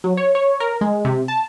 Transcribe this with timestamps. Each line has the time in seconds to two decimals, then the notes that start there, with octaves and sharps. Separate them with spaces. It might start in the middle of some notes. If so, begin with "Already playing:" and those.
0.04 F#3
0.17 C#5
0.35 C#5
0.60 A#4
0.81 G#3
1.05 C3
1.28 A5